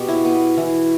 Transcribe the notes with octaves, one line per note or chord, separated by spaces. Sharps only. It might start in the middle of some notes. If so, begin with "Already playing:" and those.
Already playing: B2 G4
E4
B3
E3